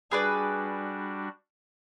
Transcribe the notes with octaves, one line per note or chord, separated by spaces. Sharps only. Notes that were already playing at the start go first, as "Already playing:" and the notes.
G3 D4 F#4 G#4 B4 D5